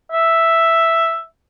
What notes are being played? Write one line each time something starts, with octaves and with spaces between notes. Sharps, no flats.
E5